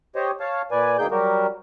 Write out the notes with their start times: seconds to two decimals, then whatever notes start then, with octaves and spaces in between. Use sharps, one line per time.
0.16 G4 C5 C#5 D#5
0.40 C#5 F5 A5
0.71 A#2 B4 D5 G#5
0.99 D2 A#3 D#4 G#4 G5 G6
1.11 F#3 G3 F#4 G4 A#4